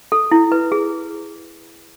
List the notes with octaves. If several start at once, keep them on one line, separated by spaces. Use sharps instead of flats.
A4
E4
B4
G#4